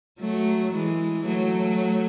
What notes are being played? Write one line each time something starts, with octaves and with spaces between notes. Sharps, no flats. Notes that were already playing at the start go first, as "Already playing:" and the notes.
F#3 A3
E3 G#3
F#3 A3